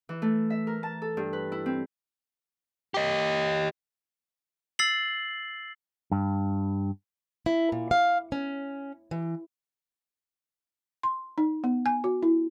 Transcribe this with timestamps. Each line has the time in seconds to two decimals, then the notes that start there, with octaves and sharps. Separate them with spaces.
0.09 E3
0.22 A3
0.50 E5
0.67 A#4
0.83 A5
1.02 A4
1.17 G2
1.33 B4
1.52 E4
1.66 C4
2.94 G4 D#5
4.79 E6 A6 C7 F#7
6.12 G2
7.46 E4
7.72 A#2
7.91 F5
8.32 C#4
9.11 E3
11.03 C6
11.38 D#4
11.64 B3
11.86 G#5
12.04 F#4
12.23 E4